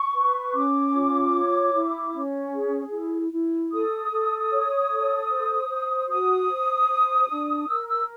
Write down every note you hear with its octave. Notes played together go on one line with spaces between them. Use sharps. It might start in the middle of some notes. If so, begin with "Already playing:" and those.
Already playing: C#6
B4
C#4 D6
F4
C#5
E4
C#4
G#4
E4
E4
A4 D#6
A4
C#5
A4
C5
C5
F#4 D#6
C5
C5
D4
A#4 E6
E6